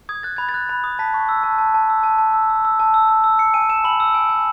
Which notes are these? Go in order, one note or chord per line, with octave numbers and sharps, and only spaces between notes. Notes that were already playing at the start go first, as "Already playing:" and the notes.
D#6 G#6
F#6 A6
B5 G#6
A6
F#6
B5
D#6
A5 B6
C#6
E6
A5
A5
A5
E6
A5
A5
E6
E6
E6
A5
E6
E6
E6
E6 C#7
G#5 D#7
G#5 E7
B5 F#7
E6
G#5
G#5